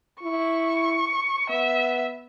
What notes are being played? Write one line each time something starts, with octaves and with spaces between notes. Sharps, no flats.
E4 C#6
B3 E5